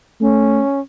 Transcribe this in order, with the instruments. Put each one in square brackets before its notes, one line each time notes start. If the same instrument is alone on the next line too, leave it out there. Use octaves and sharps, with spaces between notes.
[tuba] A3 [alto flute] C#4